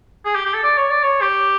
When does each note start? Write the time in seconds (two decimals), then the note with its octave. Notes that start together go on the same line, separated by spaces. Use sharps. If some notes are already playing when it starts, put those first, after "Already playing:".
0.25 G#4
0.35 G4
0.45 G4
0.54 A4
0.63 D5
0.77 C#5
0.90 D5
1.03 C#5
1.22 G4